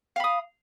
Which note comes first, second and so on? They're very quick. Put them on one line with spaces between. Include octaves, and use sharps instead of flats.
F5 B5 D#6